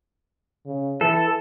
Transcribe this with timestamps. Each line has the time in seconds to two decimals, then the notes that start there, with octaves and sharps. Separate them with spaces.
0.66 C#3
1.01 E3 A4